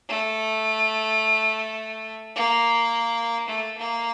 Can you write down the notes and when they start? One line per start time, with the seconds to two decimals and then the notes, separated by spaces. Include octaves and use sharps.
0.09 A3
2.36 A#3
3.49 A3
3.78 A#3